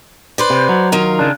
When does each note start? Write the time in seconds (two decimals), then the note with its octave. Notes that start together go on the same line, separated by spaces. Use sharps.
0.38 B4 C5 D5
0.50 C3
0.69 F#3
0.92 D#3 F4 A#4
1.19 C#3 D4